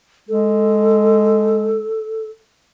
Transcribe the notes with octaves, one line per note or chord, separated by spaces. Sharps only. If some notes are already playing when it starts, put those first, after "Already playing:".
G#3 A4